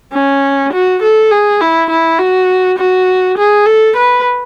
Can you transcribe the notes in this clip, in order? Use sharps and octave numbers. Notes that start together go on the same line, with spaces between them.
C#4
F#4
A4
G#4
E4
E4
F#4
F#4
G#4
A4
B4